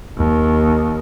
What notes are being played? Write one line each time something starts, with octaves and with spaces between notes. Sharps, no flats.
D#2